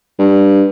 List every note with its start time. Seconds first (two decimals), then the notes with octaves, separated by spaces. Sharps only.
0.19 G2